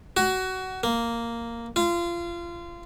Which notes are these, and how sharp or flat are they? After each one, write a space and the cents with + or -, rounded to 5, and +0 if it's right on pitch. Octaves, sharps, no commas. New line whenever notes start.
F#4 +20
A#3 -5
F4 -25